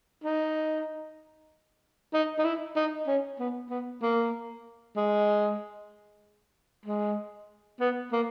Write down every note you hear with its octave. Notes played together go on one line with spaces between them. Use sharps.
D#4
D#4
D#4
E4
D#4
C#4
B3
B3
A#3
G#3
G#3
B3
A#3